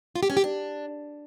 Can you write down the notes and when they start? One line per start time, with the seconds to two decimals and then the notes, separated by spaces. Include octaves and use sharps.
0.16 F4
0.23 G4
0.30 C#4
0.37 G4
0.44 D4